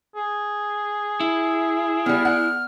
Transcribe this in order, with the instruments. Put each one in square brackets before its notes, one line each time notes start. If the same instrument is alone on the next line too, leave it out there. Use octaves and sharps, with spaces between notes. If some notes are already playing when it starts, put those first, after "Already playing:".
[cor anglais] G#4
[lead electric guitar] E4
[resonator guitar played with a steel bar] G3 B3 [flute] F6
[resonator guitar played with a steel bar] F#5